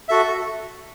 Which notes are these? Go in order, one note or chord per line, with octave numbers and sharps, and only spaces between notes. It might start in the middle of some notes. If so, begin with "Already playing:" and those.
F#4 A4 E5